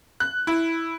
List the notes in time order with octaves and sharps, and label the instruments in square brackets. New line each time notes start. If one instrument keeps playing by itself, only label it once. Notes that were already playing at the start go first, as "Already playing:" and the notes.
[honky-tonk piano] F#6
E4